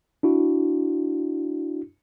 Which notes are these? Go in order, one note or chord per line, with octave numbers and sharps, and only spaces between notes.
D4 E4 F#4